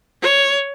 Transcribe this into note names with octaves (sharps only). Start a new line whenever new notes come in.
C#5